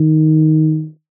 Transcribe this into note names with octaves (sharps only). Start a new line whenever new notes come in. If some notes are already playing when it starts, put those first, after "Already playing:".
Already playing: D#3